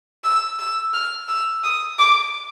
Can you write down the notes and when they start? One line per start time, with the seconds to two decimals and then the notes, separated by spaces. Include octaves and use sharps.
0.24 E6
0.59 E6
0.94 F6
1.28 E6
1.63 D#6
1.99 D6